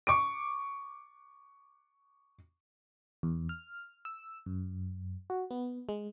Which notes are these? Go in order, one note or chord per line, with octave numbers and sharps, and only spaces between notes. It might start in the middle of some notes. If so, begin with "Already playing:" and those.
C#6 D6 D7
E2
F6
E6
F#2
F#4
B3
G#3